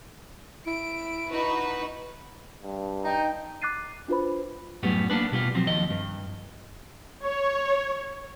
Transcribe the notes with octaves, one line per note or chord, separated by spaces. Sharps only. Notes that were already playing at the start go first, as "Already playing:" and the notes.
E4 D7
D#4 F#4 B4
G2
D#4 G5
D6 F#6 A6 C7 D#7
D4 F4 F#4 B4 C5 B5
F#2 A2 G3 B3
A#3 B3 D4 B4
B2 G3 F4
F3 F#3 C4
D#2 F3 D#5
G2
C#5